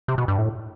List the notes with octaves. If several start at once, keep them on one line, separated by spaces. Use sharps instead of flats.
C3
B2
G2
A2